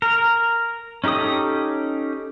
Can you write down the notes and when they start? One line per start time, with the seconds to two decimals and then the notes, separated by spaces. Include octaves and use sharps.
0.02 A#4
1.04 C#4 D#4 G4 A4 D#6